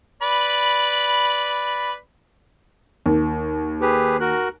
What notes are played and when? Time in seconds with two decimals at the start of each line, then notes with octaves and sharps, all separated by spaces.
0.22 B4 D5 B5
3.06 D#2
3.81 G4 G#4 B4
4.20 F#4 A#4 F#6